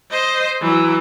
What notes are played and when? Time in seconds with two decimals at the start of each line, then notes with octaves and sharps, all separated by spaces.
0.11 C5 D#5
0.60 E3 F#3